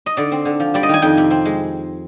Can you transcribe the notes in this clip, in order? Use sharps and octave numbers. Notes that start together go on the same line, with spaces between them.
D#5
D3 D5
C4
D3
F3
G3 D5
D#5
D#3 G#5
F2 G5
C3
C4
G#3